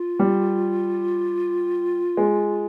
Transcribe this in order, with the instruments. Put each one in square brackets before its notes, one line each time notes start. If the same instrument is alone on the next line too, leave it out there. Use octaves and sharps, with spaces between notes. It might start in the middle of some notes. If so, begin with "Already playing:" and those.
Already playing: [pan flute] F4
[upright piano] G3
G#3